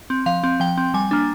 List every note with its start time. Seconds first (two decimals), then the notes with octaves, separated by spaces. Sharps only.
0.10 C4
0.26 F3 F5
0.44 C4
0.60 F3 G5
0.78 C4
0.94 G3 G#5
1.11 A#3 D4